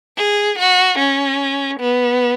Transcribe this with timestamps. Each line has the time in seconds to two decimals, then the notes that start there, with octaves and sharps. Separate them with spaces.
0.18 G#4
0.58 F#4
0.98 C#4
1.79 B3